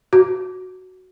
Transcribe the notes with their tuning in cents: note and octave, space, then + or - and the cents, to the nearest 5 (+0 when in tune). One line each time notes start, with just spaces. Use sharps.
F#4 +5